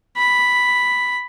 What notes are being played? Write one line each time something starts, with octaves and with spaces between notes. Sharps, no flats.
B5